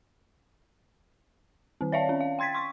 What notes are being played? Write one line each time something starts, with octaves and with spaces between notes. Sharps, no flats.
D#3 C4
C#5 D5 E5 F5 A5
C#4
F5
G5 C6 G#6 A6 B6
C6 C#6 B6